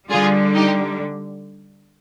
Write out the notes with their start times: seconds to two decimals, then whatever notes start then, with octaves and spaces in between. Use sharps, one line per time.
0.10 D3 G3 F4 G#4
0.54 D#4 G4